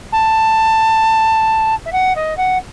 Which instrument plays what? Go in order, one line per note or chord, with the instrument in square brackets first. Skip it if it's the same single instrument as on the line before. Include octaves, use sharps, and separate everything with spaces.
[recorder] A5
E5
F#5
D#5
F#5